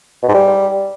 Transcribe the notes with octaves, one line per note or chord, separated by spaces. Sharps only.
B2
G#2
G3